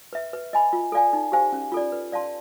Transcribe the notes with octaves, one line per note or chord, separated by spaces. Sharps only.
B4 E5
B4
D#5 G#5 B5
F4
A4 D5 F5 G#5
D#4
G4 C5 F5 G#5
C#4
F4 A4 D5
B4
D5 F5 A5 C6